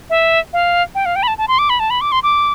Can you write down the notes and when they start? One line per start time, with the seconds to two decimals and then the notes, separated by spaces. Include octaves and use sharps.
0.10 E5
0.53 F5
0.95 G5
1.06 F5
1.16 G5
1.23 B5
1.28 A5
1.38 A5
1.48 C6
1.59 D6
1.70 B5
1.80 A5
1.90 B5
2.01 D6
2.12 C6
2.23 D6